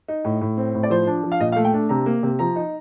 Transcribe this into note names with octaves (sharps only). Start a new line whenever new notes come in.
D#4
A2
A2
C4
A2
D5
F3 C5
D4
F3
F5
A#2 D#5
F5
A3
G5
D4
C3 A#5
A#3
C3
F3 A#5
D#4